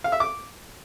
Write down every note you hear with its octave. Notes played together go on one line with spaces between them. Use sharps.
F5
E5
D6